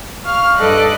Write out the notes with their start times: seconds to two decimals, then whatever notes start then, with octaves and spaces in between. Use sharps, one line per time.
0.25 F5 C#6 F6
0.57 G2 A4 B4 D5 D#5 F#6